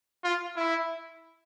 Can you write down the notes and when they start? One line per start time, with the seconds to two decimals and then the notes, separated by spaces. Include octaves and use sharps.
0.24 F4
0.56 E4